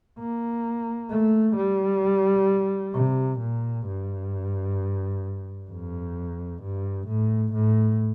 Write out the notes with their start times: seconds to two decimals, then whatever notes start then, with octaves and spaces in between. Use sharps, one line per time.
0.19 A#3
1.10 A3
1.57 G3
2.94 C3
3.40 A#2
3.87 G2
5.70 F2
6.63 G2
7.08 A2
7.54 A2